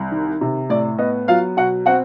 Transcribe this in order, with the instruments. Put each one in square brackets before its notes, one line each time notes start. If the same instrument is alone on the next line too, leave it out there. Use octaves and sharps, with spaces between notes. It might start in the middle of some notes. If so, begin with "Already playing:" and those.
Already playing: [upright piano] C2
D#3
C3
A2 D5
B3 D#5
F#3 F4 F5
B2 F#4 F#5
C4 F#4 F#5